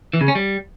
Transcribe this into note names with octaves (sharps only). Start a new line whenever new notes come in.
E3
C#3
C#4
G3